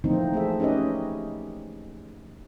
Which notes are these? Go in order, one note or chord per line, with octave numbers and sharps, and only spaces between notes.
E3 F3 A3 A#3 C4 D#4
A3 G#4 E5
C#4 D#4 G4 B4 D#5